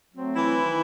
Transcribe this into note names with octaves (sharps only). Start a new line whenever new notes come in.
F#3 A3 C4
E3 E4
D#3